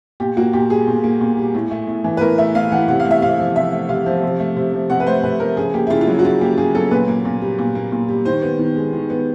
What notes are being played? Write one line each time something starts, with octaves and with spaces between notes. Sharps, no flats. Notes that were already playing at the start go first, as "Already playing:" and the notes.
A#2 G4
A#3 F#4
A#2 G4
G3 G#4
A#2
A#3
A#2
G3
A2
A3
A2
E3
B4
A2 A#4
A3 E5
A2 F5
E3 F#5
C3 F#5
F5
A3
E5
C3 F5
F3
C3 E5
A3
C3 F5
F3
C3
A3
C3
F3
C3 F#5
B4
A3 C5
C3 B4
F3 A#4
C#3 G#4
A#3 G4
E4
C#3 F4
F4
F#3 E4
F#4
C#3 F4
A#3 G4
C#3 G#4
F#3 A4
A#2 B4
A#3
A#2
G3
A#2
A#3
A#2
G3
D#3 C5
B3
D#3
G#3
D#3
B3